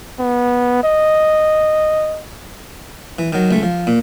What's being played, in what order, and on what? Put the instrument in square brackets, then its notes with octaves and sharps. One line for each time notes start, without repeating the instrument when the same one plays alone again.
[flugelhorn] B3
D#5
[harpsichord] E3
D#3 F#3
C#2 A3
F3
A#2